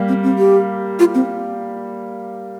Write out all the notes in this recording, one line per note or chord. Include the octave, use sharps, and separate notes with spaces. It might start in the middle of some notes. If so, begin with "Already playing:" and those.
Already playing: G3 A#3 G4
C4
C4
G4
F4
C4